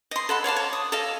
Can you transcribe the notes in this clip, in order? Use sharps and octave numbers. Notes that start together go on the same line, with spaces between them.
D#5 C6
A4 F#5 B5
C#5 D5 F5 A5
C#5
D#6
A4 D#5 F5